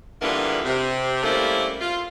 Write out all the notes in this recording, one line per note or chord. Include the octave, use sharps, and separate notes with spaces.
A#2 D3 E3 G3 A#3 B3
C3
G3 A3 A#3 C4 C#4 E4
F4